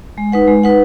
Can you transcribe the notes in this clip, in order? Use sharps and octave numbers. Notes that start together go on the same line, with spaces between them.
G#3
D#4 B4 F#5
G#3
D#4 B4 F#5